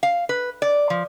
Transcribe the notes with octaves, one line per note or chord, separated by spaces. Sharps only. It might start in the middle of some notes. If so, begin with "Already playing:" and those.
F5
B4
D5
F3